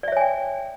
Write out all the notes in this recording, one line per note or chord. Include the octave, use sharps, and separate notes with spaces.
C#5 D5 E5 G5 G#5